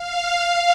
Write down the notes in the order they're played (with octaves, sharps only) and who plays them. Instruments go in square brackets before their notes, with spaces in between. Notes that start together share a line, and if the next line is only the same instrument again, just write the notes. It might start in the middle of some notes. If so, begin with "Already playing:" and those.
Already playing: [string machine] F5